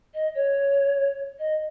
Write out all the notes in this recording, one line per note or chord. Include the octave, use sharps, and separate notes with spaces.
D#5
C#5
D#5